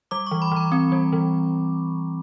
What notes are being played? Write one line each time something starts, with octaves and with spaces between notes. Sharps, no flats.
G3 D6
E3 C#6
B5
E3 A#5
C4
G3
E3